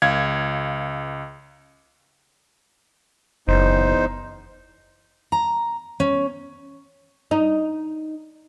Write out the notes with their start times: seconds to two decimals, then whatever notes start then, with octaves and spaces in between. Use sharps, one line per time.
0.02 C#2 F5 G#6
3.48 F#1 E2 D#4 C5
5.32 A#5
6.00 C#4
7.31 D#4